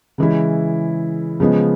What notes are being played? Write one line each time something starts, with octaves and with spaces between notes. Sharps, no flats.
C#3 E3 G#3 C#4 E4
C#3 F3 G#3 B3